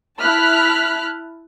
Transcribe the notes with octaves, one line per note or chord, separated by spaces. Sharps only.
E4 A5 F6 F#6 B6